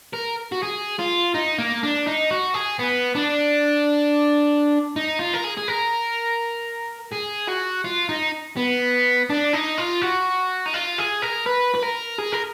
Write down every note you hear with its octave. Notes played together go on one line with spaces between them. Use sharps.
A#4
F#4
G#4
F4
D#4
A#3
D4
D#4
F#4
G#4
B3
D4
D#4
F4
A#4
G#4
G#4
A#4
G#4
F#4
F4
D#4
B3
D4
D#4
F4
F#4
D#4
F4
G#4
A#4
B4
B4
A#4
G#4
A#4